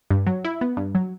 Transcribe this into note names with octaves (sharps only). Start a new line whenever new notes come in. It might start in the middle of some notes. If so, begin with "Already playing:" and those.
G2
F#3
E4
B3
G2
F#3